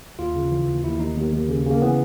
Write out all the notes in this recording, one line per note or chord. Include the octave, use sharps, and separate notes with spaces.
D#2 F4
C#3
E3
D#2
D#2 E4
D#2 D#4
D#2
D#2
C#3
C#3
A#3
E3 B3